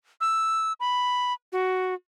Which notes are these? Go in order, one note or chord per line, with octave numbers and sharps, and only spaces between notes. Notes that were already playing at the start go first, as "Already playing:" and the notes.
E6
B5
F#4